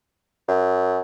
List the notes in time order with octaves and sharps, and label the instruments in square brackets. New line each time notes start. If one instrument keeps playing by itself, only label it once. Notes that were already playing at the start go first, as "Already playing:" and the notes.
[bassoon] F#2